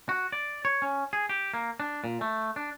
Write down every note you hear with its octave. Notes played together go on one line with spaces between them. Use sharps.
F#4
D5
C#5
C#4
G#4
G4
A#3
D4
A#2
A3
D4